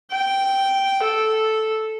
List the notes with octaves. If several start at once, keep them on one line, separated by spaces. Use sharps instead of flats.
G5
A4